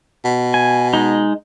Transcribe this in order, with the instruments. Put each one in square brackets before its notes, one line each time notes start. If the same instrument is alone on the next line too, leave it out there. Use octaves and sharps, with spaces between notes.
[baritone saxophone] B2
[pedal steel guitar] G#5
G#3 D#4